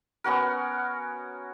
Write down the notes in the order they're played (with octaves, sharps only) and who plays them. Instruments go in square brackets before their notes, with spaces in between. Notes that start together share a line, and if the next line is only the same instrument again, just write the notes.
[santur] B3 C#4 F#4 A#4